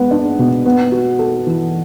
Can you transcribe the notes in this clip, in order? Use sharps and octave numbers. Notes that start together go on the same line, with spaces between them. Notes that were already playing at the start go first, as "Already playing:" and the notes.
Already playing: G#3 B3
D4
B2
B3
F#4
A4
E3